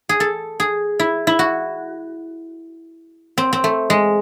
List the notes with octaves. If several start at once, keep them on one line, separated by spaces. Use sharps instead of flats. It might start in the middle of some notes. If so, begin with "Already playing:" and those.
G#4
A4
G#4
E4
E4
F#4
C4
C4
A3
G#3